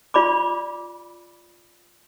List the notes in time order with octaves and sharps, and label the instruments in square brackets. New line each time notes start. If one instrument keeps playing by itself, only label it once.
[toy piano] F4 D5 B5 D6